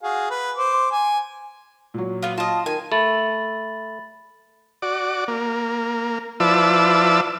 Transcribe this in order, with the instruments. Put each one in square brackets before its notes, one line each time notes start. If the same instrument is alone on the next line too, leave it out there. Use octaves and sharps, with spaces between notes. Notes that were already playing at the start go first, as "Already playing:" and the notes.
[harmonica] F#4 G#4 F5
B4
C5 D6
G#5
[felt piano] A#2 F#3
[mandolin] B3 F4
[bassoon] F4 [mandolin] D#5 A5
[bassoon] D#3 [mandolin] G#5
[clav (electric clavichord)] A3 [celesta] B5 A6 F#7
[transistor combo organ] F#4 D5
A#3
F3 E4 B4 D5 A5 E6